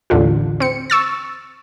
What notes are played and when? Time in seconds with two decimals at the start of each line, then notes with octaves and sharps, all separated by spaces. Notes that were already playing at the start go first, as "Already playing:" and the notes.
0.10 A1 D#2 D3 F4
0.60 C4 C#7
0.90 C#6 E6 A6